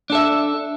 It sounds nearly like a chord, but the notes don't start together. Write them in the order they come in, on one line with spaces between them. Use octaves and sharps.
D4 A4 E5